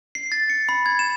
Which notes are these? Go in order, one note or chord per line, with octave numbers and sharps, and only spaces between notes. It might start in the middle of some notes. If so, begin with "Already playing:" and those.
C7
A6
C#7
B5
G#6
E7